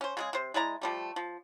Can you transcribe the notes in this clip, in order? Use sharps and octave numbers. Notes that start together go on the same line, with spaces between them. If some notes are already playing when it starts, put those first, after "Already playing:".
C#4 C5
C#3 G#3 G#4
C3 C5
G#3 E4 D5 A#5
F3 G3 A3
F3